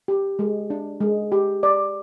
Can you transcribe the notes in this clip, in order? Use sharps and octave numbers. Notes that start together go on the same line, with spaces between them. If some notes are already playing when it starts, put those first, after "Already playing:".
G4
G#3
D4
G#3
G4
D5